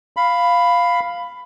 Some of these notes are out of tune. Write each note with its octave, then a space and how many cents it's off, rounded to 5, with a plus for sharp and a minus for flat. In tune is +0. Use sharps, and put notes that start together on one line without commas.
F5 +0 B5 +10